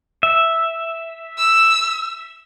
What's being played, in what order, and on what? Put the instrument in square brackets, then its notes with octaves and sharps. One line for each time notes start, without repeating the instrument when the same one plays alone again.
[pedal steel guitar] E5
[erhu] E6